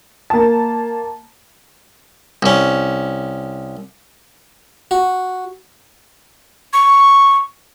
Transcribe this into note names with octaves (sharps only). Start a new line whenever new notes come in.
A#3 A5
C2 C#4
F#4
C#6